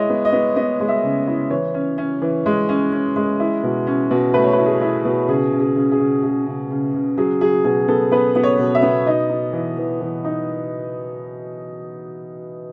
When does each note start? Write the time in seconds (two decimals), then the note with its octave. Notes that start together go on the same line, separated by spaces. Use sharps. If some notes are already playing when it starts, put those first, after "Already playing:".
Already playing: G#3 E4 C#5 D#5
0.09 B3
0.25 D#5
0.33 B3
0.56 B3 D#5
0.80 G#3
0.88 E5
1.04 C#3
1.27 E4
1.50 E3 C#5
1.74 C#4
1.98 C#4
2.22 E3
2.46 G#3
2.69 C#4
2.92 C#4
3.16 G#3
3.40 E4
3.63 B2
3.87 C#4
4.11 B2
4.34 A3 B4
4.44 C#5
4.53 B4
4.58 E4
4.66 G#4
4.81 E4
5.05 B2
5.29 C#3 G#4
5.53 C#3
5.60 G#4
5.76 C#3
5.92 G#4
5.99 C#3
6.23 C#3 G#4
6.46 C#3
6.70 C#3
6.94 C#3
7.17 F#3 G#4
7.41 F#3 G#4
7.64 B2 G#4
7.88 B3 A4
8.12 B3 B4
8.35 B3
8.43 C#5
8.59 B2
8.75 E5
8.83 B3
9.06 D#4 D#5
9.30 D#4
9.53 E3
9.77 E3
10.01 E3
10.24 D#4